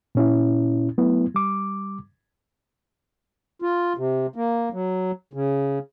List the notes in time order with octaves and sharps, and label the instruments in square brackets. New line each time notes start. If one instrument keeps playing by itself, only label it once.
[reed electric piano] A#2 C#4 E4
F#3 A3 B3 E4
G3 D6
[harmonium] F4
C3
A#3
F#3
C#3